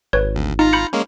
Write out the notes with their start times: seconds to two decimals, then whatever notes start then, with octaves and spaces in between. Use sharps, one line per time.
0.13 G#1 B4 C#5
0.35 D2
0.59 D#4 F4 A#5
0.73 B5 G6 C#7
0.93 G#3 A#3 C#4